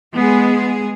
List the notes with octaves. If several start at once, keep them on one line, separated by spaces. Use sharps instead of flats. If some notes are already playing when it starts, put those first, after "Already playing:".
G#3 B3 G#4